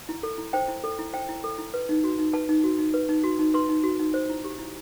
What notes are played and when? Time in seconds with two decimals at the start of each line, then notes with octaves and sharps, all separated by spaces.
0.09 E4
0.23 A4
0.38 E4
0.53 C5 G5
0.68 E4
0.84 A4
0.99 E4
1.13 C5 G5
1.29 E4
1.44 A4
1.58 E4
1.74 B4
1.89 D#4
2.04 F#4
2.19 D#4
2.33 B4 A5
2.49 D#4
2.64 F#4
2.79 D#4
2.94 B4
3.09 D#4
3.24 F#4
3.39 D#4
3.54 B4 C6
3.69 D#4
3.84 F#4
4.00 D#4
4.14 C5
4.30 E4
4.44 G4
4.59 E4